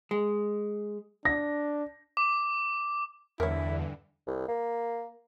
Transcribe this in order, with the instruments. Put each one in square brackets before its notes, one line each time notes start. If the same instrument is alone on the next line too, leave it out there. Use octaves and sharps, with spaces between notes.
[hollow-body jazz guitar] G#3
[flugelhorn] D4 [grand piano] A#6
[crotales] D6
[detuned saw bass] E2 [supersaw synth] G2 D3 E3 [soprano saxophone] E4 [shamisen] A#4 C#5
[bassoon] C2
A#3